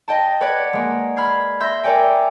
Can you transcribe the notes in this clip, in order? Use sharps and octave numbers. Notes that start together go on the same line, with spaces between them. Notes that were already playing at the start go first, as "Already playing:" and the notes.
D#5 G5 A5
B4 C#5 D5 F#5 G#6
G#3 A#3
B5 F6 G#6 C7
E5 C6 E6 G6 A#6
A#4 C#5 D5 G5 G#5